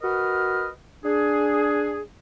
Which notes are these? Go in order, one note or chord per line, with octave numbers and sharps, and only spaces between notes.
F#4 A#4 B4 D#5 F6
D4 G#4